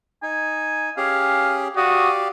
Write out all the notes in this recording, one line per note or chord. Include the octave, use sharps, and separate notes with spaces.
D#4 G#5
C#4 G4 G#4 F5
F#4 G4 D5 F5 D#6